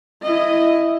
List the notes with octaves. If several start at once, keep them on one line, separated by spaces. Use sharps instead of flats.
E4 D#5